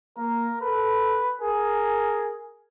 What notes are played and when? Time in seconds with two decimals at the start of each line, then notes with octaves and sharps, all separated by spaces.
0.17 A#3 A#4
0.61 A4 B4
1.42 G#4 A#4